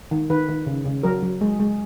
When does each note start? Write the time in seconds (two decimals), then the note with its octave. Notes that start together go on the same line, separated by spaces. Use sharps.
0.11 D#3
0.30 D#3 B4
0.48 D#3
0.67 C#3
0.85 C#3
1.03 F#3 A#4
1.23 F#3
1.41 G#3
1.60 G#3